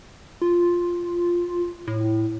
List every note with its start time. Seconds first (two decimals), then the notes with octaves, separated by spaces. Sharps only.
0.42 F4
1.87 A2